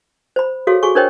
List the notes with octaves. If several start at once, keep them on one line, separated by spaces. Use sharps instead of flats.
C5 B5
F#4 G#4 A4 C#5 F5
F#4 G#4 A4 G#5 C#6
D4 A#4 C5 C#5 D#5 G5